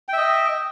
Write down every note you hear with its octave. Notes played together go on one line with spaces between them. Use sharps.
D#5 E5 G5